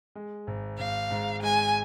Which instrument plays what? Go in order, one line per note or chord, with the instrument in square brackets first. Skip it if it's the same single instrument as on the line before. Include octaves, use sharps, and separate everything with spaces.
[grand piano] G#3
G#1
[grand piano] G#1 [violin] F5
[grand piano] G#2
[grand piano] G#3 [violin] G#5